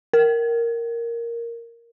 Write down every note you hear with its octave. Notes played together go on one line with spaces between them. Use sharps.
A#4